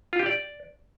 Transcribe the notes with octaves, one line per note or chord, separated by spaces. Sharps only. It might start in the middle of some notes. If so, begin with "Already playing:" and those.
F4
G4
D5